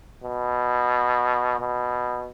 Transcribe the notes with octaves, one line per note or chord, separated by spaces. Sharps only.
B2
B2